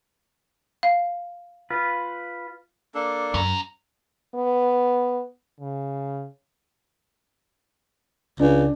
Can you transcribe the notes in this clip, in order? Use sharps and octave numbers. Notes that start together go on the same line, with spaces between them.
F5
F4 B4
A#3 D4 A4
F#2 C#4 A#5
B3
C#3
C#2 D4